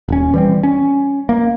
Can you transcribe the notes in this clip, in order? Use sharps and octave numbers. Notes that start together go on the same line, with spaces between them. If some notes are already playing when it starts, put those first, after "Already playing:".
D#1 C#4
E3 G3 C4
C#4
A#3